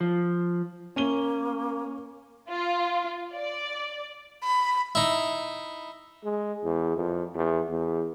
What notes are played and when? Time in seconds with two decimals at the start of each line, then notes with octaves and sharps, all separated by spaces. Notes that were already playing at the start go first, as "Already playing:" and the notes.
0.01 F3
0.96 A#3 C#4 D#7 G7
2.50 F4
3.34 D5
4.44 B5
4.95 D#4 E4
6.24 G#3
6.64 E2
6.96 F2
7.34 E2
7.69 E2